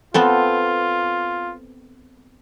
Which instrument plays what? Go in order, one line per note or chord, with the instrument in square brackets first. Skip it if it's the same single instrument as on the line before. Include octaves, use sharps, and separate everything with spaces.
[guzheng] B3 C4 A4 [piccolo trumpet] F4